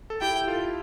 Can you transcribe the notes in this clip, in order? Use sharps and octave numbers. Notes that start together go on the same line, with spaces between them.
A4
E4 G4 G5
F4 A4